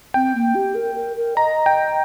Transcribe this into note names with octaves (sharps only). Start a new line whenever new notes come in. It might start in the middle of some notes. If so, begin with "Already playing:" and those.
C4 G5
A#3
G4
A#4
A#4
A#4
D#5 A#5
G5